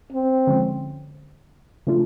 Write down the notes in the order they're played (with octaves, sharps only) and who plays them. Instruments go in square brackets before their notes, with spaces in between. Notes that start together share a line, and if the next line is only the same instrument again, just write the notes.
[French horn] C4
[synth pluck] D3 F3 G#3 C#4
C#3 F3 A3 D4 F4